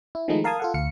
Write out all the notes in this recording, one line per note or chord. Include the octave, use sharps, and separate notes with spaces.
E4
D#3 F3 G#3 A3 D#4 E4
A#4 F5 A5 D#6 G#6
F4 A4 F#5
D2 F5 C#7